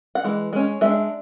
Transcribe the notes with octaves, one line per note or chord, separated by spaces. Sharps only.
F#5
E3 G#3
G#3 C#4
G#3 D4 E5